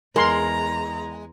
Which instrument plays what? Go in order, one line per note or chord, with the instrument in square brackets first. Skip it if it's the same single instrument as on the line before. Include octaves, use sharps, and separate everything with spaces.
[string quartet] E2 A#5 [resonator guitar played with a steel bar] G#3 [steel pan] A#4 C6